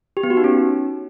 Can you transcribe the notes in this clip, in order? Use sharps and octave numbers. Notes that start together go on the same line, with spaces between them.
G4
B3
F#4
D#4
C#4